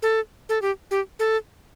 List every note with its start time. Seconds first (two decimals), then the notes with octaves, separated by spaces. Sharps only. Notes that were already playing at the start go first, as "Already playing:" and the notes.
0.02 A4
0.49 A4
0.62 G4
0.91 G4
1.19 A4